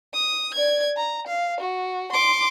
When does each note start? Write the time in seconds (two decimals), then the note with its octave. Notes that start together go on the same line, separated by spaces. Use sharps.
0.14 D#6
0.54 D5 G#6
0.97 A#5
1.27 F5
1.60 F#4
2.12 C6 D6